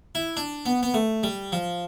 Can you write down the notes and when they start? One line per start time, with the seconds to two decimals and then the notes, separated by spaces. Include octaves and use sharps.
0.15 E4
0.37 D4
0.66 B3
0.83 B3
0.94 A3
1.23 G3
1.52 F3